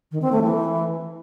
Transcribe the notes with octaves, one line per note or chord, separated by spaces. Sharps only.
D#3
C4
A3
E3